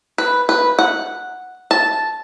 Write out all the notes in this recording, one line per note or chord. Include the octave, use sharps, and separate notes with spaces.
B4
B4
F#5
A5